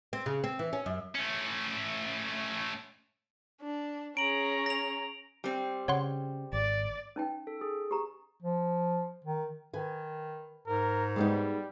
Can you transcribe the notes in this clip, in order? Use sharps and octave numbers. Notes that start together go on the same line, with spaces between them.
C4
C#3
C4
E3
C#4
F#2
A3 C#4
D4
C#4 G#4 A#5 D7 F#7
A#6 F7
G3 C4
C#3 C#5 F#5 C6
G#1 D5
C#4 D#4 G5
A4
G#4
G4 A#5
F3
D#3
D#3 B4 G#5
G#2 A#4
G3 G#3 B3 D#4